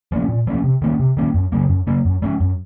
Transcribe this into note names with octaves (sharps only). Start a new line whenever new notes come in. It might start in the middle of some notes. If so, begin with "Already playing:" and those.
F3 A#3 C#4
A#2
F3 A#3 C#4
C3
D#3 A#3 C#4
C3
D#3 A#3 C#4
F#2
C#3 F#3 A#3
F#2
C#3 F#3 A#3
F#2
F3 G#3 C#4
F#2